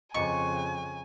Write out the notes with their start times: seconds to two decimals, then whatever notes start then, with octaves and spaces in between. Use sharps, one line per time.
0.14 F2 C#3 D#5 G#5 A#5 C#6 D6